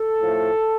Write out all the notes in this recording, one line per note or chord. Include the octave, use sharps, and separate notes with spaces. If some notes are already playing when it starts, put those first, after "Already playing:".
Already playing: A4
A2 F3 A3